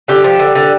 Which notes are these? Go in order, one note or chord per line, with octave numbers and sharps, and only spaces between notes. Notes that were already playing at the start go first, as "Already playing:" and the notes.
D3 G4
F3
D3
D3